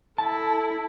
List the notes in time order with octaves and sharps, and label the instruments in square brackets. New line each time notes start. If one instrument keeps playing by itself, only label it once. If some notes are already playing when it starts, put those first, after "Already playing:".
[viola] E4 A4 [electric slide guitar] A5